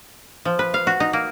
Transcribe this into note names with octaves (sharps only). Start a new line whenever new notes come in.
F3
B4
F5
F#4
D#4
A#3